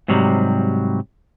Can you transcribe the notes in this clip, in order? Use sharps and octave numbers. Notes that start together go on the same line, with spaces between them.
G#2 C3 F#3 G3